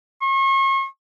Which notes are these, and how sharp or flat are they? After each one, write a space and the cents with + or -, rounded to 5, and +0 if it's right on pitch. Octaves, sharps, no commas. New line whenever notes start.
C#6 -40